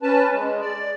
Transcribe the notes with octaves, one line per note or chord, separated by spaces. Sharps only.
C#4 B4 A5
G#3
D5